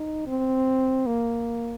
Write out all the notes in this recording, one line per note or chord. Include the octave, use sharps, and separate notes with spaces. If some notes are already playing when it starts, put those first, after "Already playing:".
Already playing: D#4
C4
A#3